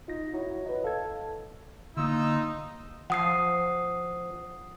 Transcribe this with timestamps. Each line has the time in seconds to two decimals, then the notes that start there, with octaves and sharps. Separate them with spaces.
0.08 D#4 F4 A#6
0.34 F#3 E4
0.66 B4 D#5
0.84 A4 F5 G#6
1.97 D3 A#3 D#4 F4 E6
3.10 F3 F#5 D#6 C7